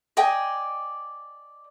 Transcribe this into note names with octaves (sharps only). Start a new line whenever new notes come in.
D5 D#5 G5 G#5